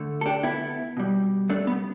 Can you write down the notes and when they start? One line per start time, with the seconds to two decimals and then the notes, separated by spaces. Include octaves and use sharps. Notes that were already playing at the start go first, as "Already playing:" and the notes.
Already playing: D3 A3
0.21 A4
0.26 D4 G4
0.43 B3 E4
0.97 B2 G3
1.50 A3 D4
1.67 B3